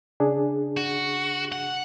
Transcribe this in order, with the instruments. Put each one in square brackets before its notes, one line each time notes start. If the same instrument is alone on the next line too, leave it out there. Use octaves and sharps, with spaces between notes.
[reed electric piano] C#3 D4 G#4
[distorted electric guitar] F#4
F#5